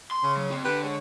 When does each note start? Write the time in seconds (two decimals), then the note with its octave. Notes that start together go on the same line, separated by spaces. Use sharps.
0.11 C6
0.23 C#3
0.37 F#3
0.50 C4 F4
0.65 D3 G4 B4
0.83 G#3 C#5